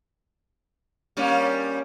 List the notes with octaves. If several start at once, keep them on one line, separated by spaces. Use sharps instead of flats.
G3 A#3 C#4